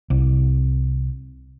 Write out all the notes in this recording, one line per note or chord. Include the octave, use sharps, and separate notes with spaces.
C2